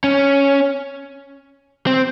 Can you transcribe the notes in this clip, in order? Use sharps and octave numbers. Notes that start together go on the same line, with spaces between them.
C#4
C4